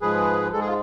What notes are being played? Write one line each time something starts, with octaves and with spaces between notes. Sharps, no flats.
G#2 F3 G#3 G#4 B4
G#2 G#3 A4
G#4
F4